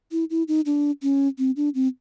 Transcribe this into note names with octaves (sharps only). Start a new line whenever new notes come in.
E4
E4
D#4
D4
C#4
C4
D4
C4